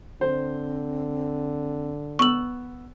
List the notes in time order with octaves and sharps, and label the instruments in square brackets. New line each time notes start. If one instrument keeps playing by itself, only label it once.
[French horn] D3 [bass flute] C4 [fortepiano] C5
[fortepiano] B3 E6 [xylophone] C#6 F#7